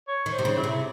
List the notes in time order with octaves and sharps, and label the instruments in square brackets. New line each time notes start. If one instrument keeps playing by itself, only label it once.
[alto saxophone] C#5
[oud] D#3
[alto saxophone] C5
[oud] C3
C#3
[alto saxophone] E4
[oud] C3